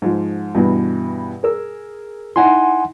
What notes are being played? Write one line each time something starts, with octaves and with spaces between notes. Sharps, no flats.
G#2 F3
G2 B2 E3
G#4 A#4 E6
D#4 E4 F#5 G#5 C6